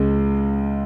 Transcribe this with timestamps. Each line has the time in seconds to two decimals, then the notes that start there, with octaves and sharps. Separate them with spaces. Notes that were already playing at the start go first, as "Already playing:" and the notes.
Already playing: C#2 C#3 G#3